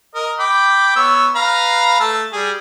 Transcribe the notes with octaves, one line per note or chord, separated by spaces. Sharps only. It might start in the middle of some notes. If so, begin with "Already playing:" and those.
A#4 D#5
G5 B5 D6
B3 C#5 E6
B4 F5 A#5
A3 A5 E6
G3 G#4